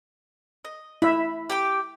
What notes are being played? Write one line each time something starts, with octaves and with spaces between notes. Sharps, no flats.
D#5
E4 E5 B5
G4 G5 D6